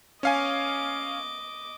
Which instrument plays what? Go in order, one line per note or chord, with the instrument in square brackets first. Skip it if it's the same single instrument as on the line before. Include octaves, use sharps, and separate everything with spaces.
[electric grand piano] C#4 F5 G#5 [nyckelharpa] D#5 D6